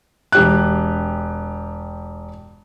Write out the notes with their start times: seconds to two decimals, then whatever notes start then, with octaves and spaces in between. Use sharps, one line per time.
0.32 E1 G4 F#6